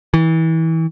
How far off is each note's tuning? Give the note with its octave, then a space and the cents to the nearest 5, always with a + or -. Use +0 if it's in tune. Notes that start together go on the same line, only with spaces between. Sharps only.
E3 -30